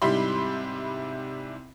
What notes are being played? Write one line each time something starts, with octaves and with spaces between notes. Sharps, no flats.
G#2 C3 G3 E4 B5 C6